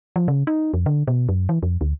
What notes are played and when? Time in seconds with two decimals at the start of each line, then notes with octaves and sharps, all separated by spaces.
0.16 F3
0.28 C#3
0.47 D#4
0.74 F2
0.86 D3
1.07 B2
1.29 F#2
1.49 E3
1.63 F2
1.81 D2